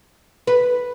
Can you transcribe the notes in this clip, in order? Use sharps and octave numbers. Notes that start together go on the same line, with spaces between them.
B4